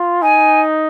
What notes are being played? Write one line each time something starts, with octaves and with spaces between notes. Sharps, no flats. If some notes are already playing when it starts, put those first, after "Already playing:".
Already playing: F4
D#4 G#5